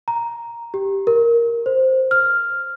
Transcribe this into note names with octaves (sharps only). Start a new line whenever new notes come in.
A#5
G4
A#4
C5
F6